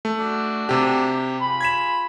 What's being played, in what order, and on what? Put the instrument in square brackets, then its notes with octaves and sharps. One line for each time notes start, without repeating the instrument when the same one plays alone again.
[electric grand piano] A3
[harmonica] D4 F#4
[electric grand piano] C3 G4
[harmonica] F4 G#4 B5
[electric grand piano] G#6 B6 E7